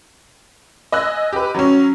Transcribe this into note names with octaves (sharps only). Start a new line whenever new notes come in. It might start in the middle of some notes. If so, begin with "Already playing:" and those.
D#5 G#5 E6 F#6
G4 B4
F#3 C#4